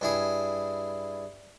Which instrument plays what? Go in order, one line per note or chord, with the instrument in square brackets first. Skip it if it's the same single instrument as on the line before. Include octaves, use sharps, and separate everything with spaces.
[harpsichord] G2 E4 G#4